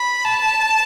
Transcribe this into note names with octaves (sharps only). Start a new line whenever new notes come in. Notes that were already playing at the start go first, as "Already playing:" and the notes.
Already playing: B5
A5